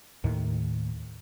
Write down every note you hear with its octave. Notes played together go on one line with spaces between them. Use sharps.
D#2 A2 D#3